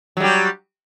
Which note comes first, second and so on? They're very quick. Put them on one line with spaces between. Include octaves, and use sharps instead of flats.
F#3 G3 G4